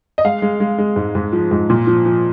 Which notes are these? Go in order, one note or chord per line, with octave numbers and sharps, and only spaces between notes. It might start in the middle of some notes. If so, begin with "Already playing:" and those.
D#5
G#3 F5
G#3
G#3
G#3
G#2
G#2
F3
G#2
A#2
F3
F3